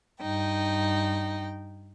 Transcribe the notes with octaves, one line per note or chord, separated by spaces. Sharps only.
G2 D#4 G5